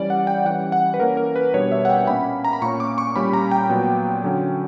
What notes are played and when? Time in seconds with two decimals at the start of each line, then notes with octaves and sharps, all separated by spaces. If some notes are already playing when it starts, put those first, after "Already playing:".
Already playing: E3 G3 C#4 D5
0.10 F#5
0.27 G5
0.45 E3 G3 C#4 F#5
0.72 F#5
0.94 B4
0.99 E3 A#3 C#4 A#4
1.17 A#4
1.36 B4
1.54 B2 G3 B3 D4 C#5
1.72 E5
1.85 F#5
1.90 G5
2.07 A#2 A#3 C#4 B5
2.45 A#5
2.53 B5
2.62 A#2 A#3 C#4 C#6
2.80 D6
2.98 C#6
3.16 A#2 G3 C#4 B5
3.33 A#5
3.51 G5
3.69 A#2 F#3 B3
4.24 D3 F#3 C#4